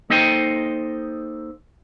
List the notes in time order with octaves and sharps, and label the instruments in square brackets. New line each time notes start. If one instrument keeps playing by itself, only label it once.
[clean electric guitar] A#3 D#4 A4 C5 D#5 G5